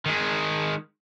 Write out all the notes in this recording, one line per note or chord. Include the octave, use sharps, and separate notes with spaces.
D#3 G#3